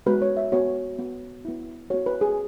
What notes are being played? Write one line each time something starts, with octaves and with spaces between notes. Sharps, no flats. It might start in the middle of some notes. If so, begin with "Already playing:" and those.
G#3 B3 F#4 B4
C#5
E5
B3 F#4 C#5
B3 F#4
B3 E4
B3 F#4 C#5
B4
G#4